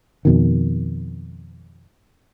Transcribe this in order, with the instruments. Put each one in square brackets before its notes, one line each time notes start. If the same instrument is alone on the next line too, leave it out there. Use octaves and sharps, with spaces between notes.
[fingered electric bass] F2 B2 D#3